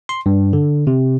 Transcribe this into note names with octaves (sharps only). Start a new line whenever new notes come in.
C6
G2
D3
C3